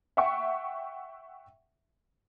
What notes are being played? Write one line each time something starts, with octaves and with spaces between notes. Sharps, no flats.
E5 F#5 G5 C#6